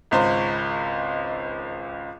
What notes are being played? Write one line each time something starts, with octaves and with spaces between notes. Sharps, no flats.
G#1 C#2 C5